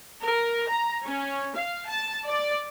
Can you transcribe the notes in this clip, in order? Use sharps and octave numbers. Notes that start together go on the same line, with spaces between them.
A#4
A#5
C#4
F5
A5
D5